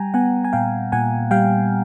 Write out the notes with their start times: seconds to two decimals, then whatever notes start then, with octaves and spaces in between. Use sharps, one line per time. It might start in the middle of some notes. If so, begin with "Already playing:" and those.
Already playing: G3 G5 G#5 A#5
0.14 B3 F#5 G#5
0.44 G#5
0.53 A#2 F5 G5
0.92 A#2 F#5 G#5
1.31 G3 F5 G5